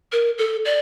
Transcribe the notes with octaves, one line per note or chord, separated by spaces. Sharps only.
A#4
A4
D5